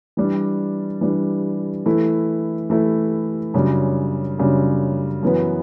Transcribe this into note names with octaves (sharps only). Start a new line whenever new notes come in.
E3 G3 D4
E3 G3 D4
E3 A3 E4
E3 A3 E4
F#2 C#3 G3 D4
F#2 C#3 G3 D4
F#2 E3 B3